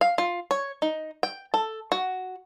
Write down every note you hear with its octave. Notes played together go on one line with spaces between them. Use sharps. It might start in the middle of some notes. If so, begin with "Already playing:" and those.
F5
F4
C#5
D#4
G5
A4
F#4